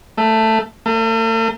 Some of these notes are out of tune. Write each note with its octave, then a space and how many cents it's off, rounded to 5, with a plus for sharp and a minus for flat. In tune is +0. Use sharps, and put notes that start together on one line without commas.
A3 +10
A3 +45